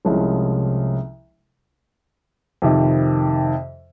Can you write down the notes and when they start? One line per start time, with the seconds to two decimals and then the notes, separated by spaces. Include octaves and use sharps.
0.05 C2 C3 F3 G#3 C#4
2.62 F2 C3 D#3